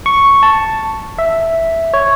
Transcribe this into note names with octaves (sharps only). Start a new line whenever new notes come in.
C#6
A5
E5
C#5